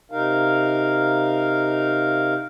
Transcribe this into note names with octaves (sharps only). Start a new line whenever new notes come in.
C3 D#4 A#4 F5